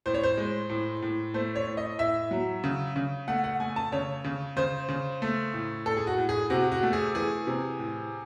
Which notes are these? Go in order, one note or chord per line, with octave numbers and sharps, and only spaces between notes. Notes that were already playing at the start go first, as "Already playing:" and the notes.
A2 C5
C#5
C5
G#3
A2
A2
A3 C5
C#5
A2
D#5
A2 E5
F#3
C#3
C#3
A3 F#5
F#5
A3 G#5
A5
C#3 C#5
C#3
C#3 C5
C#3
A3
A2
A2 A4
G#4
F#4
A2
G#4
C3 F#4
F#4
A3
G#4
E3 G#4
C3
A2